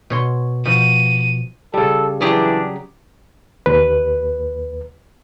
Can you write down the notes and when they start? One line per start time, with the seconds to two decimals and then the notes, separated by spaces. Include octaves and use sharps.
0.10 B2 C#5 C6
0.65 B2 F3 D#7
1.74 C#3 G3 A4
2.21 E3 F#3 D4 G4 G#4
3.66 D#2 B4